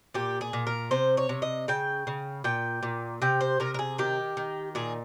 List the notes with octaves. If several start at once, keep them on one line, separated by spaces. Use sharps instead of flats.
A#2 G4
G#4
A#2
A#4
C3 C5
C#5
C3
D#5
C#3 G5
C#3
A#2 G5
A#2
C3 G5
C5
C3 A#4
A#4
G#4
D#3 G4
D#3
A#2 G#4